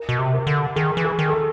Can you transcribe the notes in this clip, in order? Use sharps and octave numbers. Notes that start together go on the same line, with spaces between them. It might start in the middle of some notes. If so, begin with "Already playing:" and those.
Already playing: A#4
B2
C3
A#4
D3
D#3 G#4
E3
G#4
D#3
A4
G#4